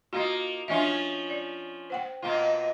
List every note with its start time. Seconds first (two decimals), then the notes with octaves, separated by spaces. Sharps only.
0.13 A#3 D#4 F4 F#4 D#5
0.68 F3 C#4 D4 F4 D#5 E5
1.30 D5
1.90 C5 F#5 G5
2.22 B2 A#3 F4